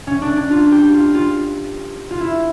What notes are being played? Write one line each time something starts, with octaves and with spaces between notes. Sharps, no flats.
C#4
D4
D4
F4
G4
F4
F4
F4
E4